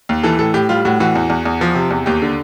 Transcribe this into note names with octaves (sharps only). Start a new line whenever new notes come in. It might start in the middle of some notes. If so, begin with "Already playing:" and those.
D#2
E3 A4
A2 A4
A2 G4
G3 F4
A2 F#4
E3 F#4
E2
E2
E2
F3
C3
E2
D#2 G4
D3